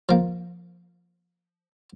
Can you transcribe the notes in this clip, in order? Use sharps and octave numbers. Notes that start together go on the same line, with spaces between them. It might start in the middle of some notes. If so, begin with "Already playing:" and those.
F3 A#3